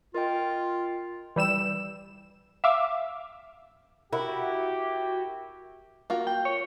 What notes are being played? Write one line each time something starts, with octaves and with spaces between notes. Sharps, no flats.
F4 A#4 D#5 G5
E3 G3 E6 E7
E5 F5 D6
E4 F#4 G4 A#4
A#3 F4 F#4
G5
C#5